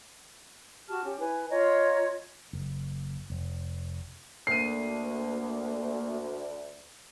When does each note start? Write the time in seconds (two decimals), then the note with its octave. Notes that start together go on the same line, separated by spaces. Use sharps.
0.89 F#4 G4 A5 F6
1.04 C#4 G4
1.19 E4 B4 G#5
1.51 F4 C#5 D#5 A#5
2.53 F#1
3.30 F1
4.47 D2 A#3 C7 D#7